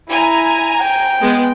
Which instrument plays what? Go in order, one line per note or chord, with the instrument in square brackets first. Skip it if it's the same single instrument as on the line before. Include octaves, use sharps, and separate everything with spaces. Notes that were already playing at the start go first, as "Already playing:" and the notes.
[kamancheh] E4 [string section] G#5 A#5
[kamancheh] G5
[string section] G#3 B3